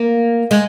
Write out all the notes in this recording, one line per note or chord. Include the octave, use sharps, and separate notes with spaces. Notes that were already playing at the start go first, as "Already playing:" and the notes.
Already playing: A#3
G#3